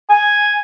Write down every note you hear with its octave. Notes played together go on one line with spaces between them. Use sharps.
G#5